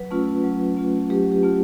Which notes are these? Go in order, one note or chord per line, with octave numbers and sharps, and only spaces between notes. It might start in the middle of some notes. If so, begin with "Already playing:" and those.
Already playing: F#3 B4
A3 C#4 F4
F#3
A3 C#4 F4
F#3 G4
G4
A3 C#4 F4